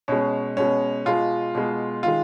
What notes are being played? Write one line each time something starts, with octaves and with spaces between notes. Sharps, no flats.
B2 G#3 C#4
B2 G#3 C#4
B2 G#3 F4
B2 G#3
D#3 G#3 F4